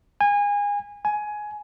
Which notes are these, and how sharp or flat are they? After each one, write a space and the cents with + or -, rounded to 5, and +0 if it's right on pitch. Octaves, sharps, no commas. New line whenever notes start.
G#5 -25
G#5 +15